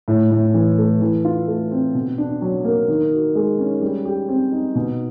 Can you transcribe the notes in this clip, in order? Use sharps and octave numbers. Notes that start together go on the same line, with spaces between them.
A2
A2
E3
A3
E3
F4
A3
C4
B2
D4
F#3
A#3
D#3
F#4
G#3
C#4
G3
G4
C4
D#4
B2